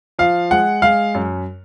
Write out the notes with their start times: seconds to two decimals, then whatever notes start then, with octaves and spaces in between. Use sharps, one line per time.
0.19 F3 F5
0.51 G#3 F#5
0.82 G#3 F5
1.15 F#2